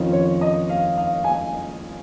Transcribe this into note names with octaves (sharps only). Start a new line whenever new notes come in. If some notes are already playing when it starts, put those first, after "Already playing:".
Already playing: F2 D#3 C#4 F4
C#5
D#5
F5
F5
G#5